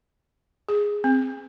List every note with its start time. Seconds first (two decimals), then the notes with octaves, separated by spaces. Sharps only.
0.69 G#4
1.04 C4